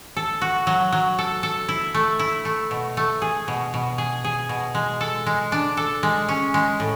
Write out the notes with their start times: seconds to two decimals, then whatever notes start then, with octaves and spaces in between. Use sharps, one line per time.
0.17 A4
0.41 F#4
0.67 F#3
0.92 F#3
1.19 A4
1.43 A4
1.69 E4
1.95 A3
2.19 E4
2.45 A3
2.71 B2
2.97 A3
3.22 G#4
3.48 B2
3.74 B2
3.98 G#4
4.24 G#4
4.49 B2
4.75 G#3
5.01 A4
5.27 G#3
5.52 D4
5.77 A4
6.03 G#3
6.29 C#4
6.54 G#3
6.80 A2